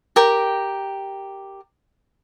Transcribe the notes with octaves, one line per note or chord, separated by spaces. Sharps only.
G4 A#4 G5